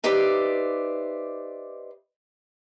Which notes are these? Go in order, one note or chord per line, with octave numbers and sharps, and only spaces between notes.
D#4 G4 B4 C5 D5 E5